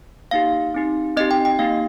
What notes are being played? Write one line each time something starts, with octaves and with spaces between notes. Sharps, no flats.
A#3 D#4 G4 F5
C4 D#4 G4
C4 D#4 G4 D#5
G5
G5
A#3 D#4 G4 F5